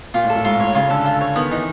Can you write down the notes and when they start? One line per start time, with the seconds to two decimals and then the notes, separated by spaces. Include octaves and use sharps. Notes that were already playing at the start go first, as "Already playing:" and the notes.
0.14 A#2 F4
0.24 A2
0.30 A4
0.35 A2
0.44 G#2 F4
0.60 A2 C#5
0.75 C#3 F4
0.90 D3 A4
1.05 F4
1.21 C#5
1.36 D#3 B3
1.51 E3 D#4